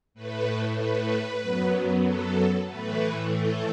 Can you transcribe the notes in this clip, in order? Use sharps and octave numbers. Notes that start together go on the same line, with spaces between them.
A2 A3 B4
B4
F#2 F#3 B3
A4
A2 E3 A3 B4
A4